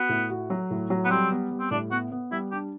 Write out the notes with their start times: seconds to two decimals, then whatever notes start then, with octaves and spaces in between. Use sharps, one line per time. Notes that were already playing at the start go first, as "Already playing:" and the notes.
Already playing: B3 F#4
0.09 A2
0.30 F#4
0.50 F#3
0.71 A2
0.90 F#3
1.05 B3
1.10 G3 C4
1.31 B3
1.51 G3
1.60 C4
1.71 A2 D4
1.91 B3 F#4
2.12 B3
2.31 G3 E4
2.51 D4 G4